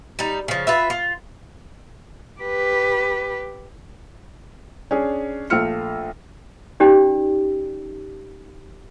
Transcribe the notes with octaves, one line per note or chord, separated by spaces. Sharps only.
G3 D#4
C#3 F3
F4 B4 E5
F4
G4 B4
C#4 D4 G#4
A#1 A3 F4 E6 F6 C#7
C#4 D#4 G4 D5